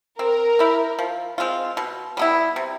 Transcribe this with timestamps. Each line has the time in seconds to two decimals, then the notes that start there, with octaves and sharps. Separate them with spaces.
0.19 C4 A#4
0.59 E4 G4
0.99 F3
1.38 G#3 C4 F4
1.77 B2
2.17 G3 B3 E4
2.56 C3